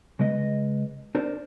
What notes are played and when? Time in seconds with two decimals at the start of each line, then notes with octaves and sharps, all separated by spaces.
0.19 C#3 G#3 B4 D#5
1.15 D4 A#4 C5 D5